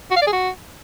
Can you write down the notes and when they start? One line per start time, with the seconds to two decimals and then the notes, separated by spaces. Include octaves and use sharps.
0.11 F#4
0.16 F5
0.22 D5
0.27 G#4
0.33 F#4